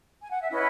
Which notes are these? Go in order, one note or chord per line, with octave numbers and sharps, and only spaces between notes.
G#5
F#5
E5
C#4 E4 B4 D#5